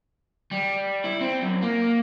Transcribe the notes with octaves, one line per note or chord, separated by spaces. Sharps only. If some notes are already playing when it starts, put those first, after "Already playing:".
G3
E4
C4
F#2
A#3